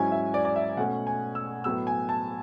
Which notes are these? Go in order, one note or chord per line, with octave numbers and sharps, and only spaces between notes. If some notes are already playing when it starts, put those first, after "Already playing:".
Already playing: G#2 F#3 C#4 E4 G#5
E5
D5
D5
E5
B2 A3 C#4 F#5
G#5
E6
A2 F#3 B3 E6
G#5
A5